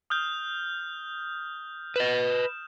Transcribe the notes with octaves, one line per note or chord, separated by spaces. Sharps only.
D#6 F6 G6
B4 D#5 E7